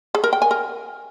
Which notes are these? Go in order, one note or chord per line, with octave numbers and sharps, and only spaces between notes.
G#4
A#4
G5
G#5
A#4